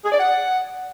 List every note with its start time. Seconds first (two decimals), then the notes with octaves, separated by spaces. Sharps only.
0.04 G#4
0.12 D5
0.19 F#5